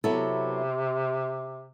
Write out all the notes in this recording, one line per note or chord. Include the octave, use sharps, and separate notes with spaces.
C3 F#3 B3 E4 A4